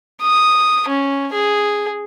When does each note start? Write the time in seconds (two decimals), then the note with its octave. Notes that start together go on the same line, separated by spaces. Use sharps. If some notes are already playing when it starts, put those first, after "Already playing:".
0.21 D#6
0.88 C#4
1.33 G#4